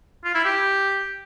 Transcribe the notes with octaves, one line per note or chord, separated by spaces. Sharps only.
F4
E4
G4